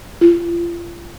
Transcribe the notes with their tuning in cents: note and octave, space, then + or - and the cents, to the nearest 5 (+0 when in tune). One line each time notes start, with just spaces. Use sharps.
F4 -35